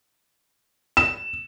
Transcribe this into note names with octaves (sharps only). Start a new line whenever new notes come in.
E7